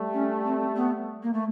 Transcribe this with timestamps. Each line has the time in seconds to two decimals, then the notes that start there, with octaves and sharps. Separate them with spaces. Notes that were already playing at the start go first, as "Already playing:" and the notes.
Already playing: G3 A3
0.14 C#4
0.45 C4
0.76 B3
1.23 A#3
1.33 A3